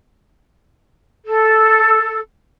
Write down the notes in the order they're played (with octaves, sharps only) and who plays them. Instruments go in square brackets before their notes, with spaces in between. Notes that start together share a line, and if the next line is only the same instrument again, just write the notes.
[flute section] A4